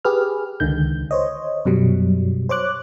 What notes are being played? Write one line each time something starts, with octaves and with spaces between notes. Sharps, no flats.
G4 G#4 B4 F6
C#2 D3 D#3 G6
C5 C#5 D#5
F#2 B2 F#3 G3
C5 C#5 D6 F#6